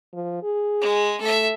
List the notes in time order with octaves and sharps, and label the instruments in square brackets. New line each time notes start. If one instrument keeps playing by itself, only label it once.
[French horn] F3
G#4
[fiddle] G#3
[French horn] A3 [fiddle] A4 E5